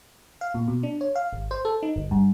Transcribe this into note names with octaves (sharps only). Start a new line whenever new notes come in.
F5
A#2
B2
D4
C#5
F5
G#1
C5
A4
D#4
G1
G2